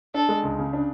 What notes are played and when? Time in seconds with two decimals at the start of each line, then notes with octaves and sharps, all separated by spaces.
0.14 D4 A4
0.29 G#3
0.43 C#2
0.59 C#3
0.73 D4